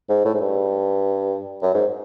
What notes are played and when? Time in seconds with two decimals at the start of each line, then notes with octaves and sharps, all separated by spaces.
0.09 G#2
0.25 A2
0.35 G#2
0.40 G2
1.62 F#2
1.74 G#2